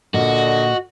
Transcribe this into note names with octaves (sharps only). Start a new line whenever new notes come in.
A#2 D3 F#4 D#5